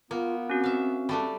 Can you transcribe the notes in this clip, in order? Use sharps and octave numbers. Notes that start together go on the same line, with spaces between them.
A#3 B3 F4
C4 C#4 F#4
E5 F5
G3 A3 D4